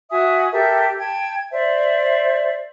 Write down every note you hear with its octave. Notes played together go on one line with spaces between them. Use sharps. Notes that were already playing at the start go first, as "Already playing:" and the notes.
F#4 E5 G#5 D#6
G4 A4 A#4 E5
G5 A5 G#6
C5 D5 E5